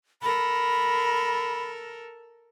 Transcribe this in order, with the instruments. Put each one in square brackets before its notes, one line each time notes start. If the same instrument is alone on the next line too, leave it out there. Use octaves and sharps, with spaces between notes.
[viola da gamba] A4 A#4 [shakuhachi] B5